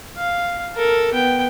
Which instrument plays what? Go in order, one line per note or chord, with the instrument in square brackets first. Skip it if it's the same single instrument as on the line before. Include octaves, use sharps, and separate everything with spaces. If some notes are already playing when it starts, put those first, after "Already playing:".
[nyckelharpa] F5
A4 A#4
B3 G5